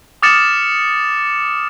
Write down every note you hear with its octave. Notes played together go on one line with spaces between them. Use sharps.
D6 D#6 F6 A6 C#7 E7